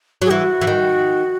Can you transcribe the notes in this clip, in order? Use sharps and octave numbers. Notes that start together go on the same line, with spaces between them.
F#3
G#4
E3 F#4
E3
D#3